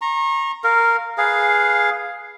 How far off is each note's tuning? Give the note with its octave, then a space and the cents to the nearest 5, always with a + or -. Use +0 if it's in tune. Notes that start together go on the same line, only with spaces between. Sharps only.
A#5 +0 C#6 -40
A#4 -10 F5 +0
G#4 +0 B4 -10 F5 +0